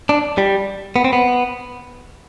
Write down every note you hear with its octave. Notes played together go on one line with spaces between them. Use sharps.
D4
G3
B3
C4
B3